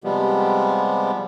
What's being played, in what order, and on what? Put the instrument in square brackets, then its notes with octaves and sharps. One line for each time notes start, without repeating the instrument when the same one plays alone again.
[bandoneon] C3 F3 G3 G#3 B3